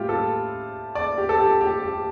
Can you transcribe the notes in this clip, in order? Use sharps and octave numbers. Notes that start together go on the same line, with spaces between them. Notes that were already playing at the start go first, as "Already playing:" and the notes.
Already playing: A2 G3 F4 G4
A4
D5
G4
A4
G4
G4
G4